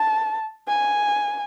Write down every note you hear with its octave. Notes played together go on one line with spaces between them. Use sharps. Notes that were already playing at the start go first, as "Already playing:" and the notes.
Already playing: A5
G#5